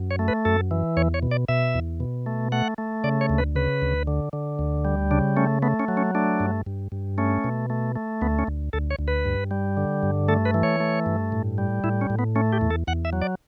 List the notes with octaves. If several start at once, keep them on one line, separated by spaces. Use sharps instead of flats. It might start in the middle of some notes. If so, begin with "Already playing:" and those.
Already playing: F#2
C#5
A3
B4
F#2 A4
E3
E2 C#5
C#5
B2
D5
B2 E5
E2
B2
A3
A3 F#5
A3
C#3 D5
C#5
D2
B4
C#3 B4
D2
D3
D3
D2
G3
C#3 D4
A3 C#4
A3 B3
C#4
F#3
C#4
A3 D4
G2
G2
G2
A3 C#4
B2
A3
A3
D2 B3
C#4
D2
D2 A4
C#5
D2
B4
G2
G3
D3
G2
A3 A4
B4
E3
C#5
A3
G2
A2
G3
A2 E4
C#4
A2
B3
A3 C#4
G4
E2
A4
E2 F#5
E5
F#3
D5